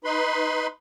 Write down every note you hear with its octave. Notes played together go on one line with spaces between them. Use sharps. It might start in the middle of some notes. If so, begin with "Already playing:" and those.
D#4 B4 B5 C6